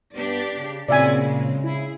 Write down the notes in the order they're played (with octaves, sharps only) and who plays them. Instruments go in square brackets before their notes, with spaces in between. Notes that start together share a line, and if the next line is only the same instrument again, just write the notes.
[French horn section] G2 B3 [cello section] D4 G4 D5
[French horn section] C#3
[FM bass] A#2 [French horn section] C#3 [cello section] C4 E4 F#4 [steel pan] D5 E5 G#5
[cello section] G#3 C4
[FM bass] E4 [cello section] G#4